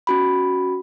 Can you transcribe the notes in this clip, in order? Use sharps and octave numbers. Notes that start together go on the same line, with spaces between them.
C#4 F#4 B5